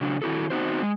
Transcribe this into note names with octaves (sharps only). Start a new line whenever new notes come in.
C#3 F#3 D4
D#3 E4 F#4 A4
B3 C4 D#4 F#4 C5
G#3